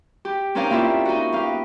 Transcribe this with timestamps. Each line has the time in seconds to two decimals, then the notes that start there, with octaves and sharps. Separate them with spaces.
0.25 G4
0.55 C4 C#4 D#4 A#4 D5 F5
0.70 A#3 E4 F4 G4 E5
1.05 D#4 F#4
1.32 B3 G4 F5